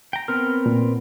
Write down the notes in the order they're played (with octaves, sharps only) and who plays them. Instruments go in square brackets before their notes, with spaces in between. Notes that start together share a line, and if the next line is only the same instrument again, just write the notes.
[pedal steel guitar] G5 A#5
[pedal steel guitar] B3 C4 A#4 [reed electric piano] F6
[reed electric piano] A#2